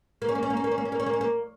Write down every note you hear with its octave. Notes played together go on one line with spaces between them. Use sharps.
A#3
C#4
A#3
C#4
A#3
C#4
A#3
C#4
A#3
C#4
A#3
C#4
A#3
C#4
A#3